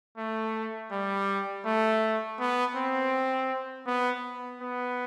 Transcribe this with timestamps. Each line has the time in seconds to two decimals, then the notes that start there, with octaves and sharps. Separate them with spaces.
0.17 A3
0.91 G3
1.66 A3
2.40 B3
2.75 C4
3.87 B3
4.61 B3